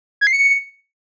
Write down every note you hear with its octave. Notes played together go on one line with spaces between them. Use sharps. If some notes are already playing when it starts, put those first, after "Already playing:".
G#6
C7
C#7